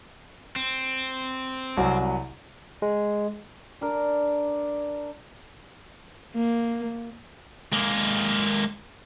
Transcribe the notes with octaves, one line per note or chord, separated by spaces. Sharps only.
C4
C2 F#3
G#3
D4 A#4
A#3
G#3 A#3